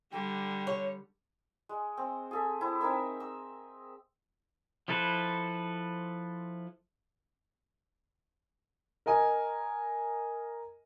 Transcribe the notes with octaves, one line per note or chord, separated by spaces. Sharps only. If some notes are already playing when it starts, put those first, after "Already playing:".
D3 G3 G5
C#5
G#3
C4
G#4 A4 E5
C4 E4
C4 D#4 A#4 E5
E6
F3 E4 A4 B4 C5
A#4 D#5 G#5